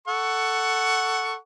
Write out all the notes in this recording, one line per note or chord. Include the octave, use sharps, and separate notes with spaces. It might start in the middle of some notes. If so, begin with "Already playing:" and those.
A4 F#5 C#6